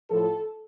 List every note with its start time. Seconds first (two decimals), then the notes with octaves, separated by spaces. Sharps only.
0.10 A2 F3 A4